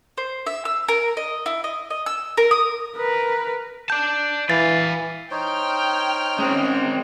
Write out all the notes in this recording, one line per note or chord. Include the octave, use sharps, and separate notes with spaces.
C5
E5
E6
A#4
D#5
E4
D#5
D#5
E6
A#4
D#6
A#4 B4
D5 A5 G6
E3 B4 F5 A6
D#4 C5 C#5 G5 F6
G#3 C4 C#4